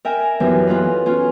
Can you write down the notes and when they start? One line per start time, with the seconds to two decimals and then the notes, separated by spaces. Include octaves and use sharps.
0.05 A#4 E5 G5 G#5
0.40 F#2 E3 B3 D#4 G4
0.67 B3 F4 A4 B4
1.06 C#4 F4